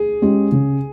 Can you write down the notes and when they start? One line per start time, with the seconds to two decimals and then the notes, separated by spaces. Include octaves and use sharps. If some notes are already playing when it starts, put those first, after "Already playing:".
Already playing: G#4
0.22 G#3 C#4 G4
0.52 C#3